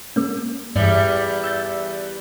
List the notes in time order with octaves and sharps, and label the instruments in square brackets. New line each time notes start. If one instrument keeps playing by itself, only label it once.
[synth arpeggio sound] G#3 A#3 C#4
[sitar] E2 G3 [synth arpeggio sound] G2
[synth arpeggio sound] E6 G6 A6